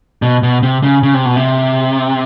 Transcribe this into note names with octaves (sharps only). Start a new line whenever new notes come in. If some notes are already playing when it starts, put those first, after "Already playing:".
B2
B2
C3
C#3
C#3
C3
B2
C3